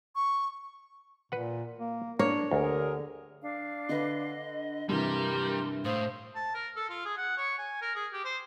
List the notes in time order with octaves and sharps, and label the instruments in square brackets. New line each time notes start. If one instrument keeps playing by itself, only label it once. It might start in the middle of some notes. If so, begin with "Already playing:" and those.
[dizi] C#6
[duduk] A#2 [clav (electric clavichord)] B4 F#5
[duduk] A#3
[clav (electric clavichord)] A#3 [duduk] D4 [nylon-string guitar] C#5
[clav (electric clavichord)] D2 [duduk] D3 [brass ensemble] G4 G#4 A#4
[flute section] D4 F5
[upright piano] D3 B4 [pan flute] D#5
[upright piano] G2 C3 E3 [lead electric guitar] G3 [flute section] G4 A#4 G6 [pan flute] C6
[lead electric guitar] A2 [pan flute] C5 [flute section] F5 C6 D#6
[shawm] A5
A#4
A4
F4
G#4
F#5
C#5
G#5
A#4
G#4
G4
C5